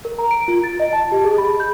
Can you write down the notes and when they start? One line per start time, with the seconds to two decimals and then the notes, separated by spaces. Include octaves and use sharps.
0.05 A#4
0.19 A#5
0.31 D7
0.48 F4
0.64 A6
0.80 D#5
0.93 A5
1.12 G4
1.25 G#4
1.38 B5
1.60 G6